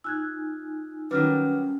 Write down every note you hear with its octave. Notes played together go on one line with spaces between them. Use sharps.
D#4 F4 G#5 E6 F#6 G#6
D#3 F#3 G3 C#4 B4 F6